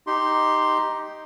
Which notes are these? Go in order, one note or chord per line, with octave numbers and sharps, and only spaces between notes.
D#4 G4 C6